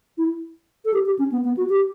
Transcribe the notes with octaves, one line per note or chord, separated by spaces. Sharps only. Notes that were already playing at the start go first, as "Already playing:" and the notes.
E4
A4
G4
G4
C#4
B3
B3
F#4
G4